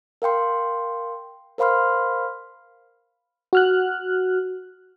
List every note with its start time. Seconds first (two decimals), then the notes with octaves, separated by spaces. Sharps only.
0.22 A#4 F5 G5 C6
1.58 A#4 C5 F5 B5 C6 F6
3.53 F#4 F6 F#6